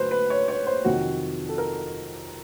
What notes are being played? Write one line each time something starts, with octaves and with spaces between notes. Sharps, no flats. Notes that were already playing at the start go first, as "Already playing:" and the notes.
Already playing: D3 F#3 A3 B4 C5
B4
C#5
C#5
C5
F2 C3 D#3 F#3 F#4
A4
A#4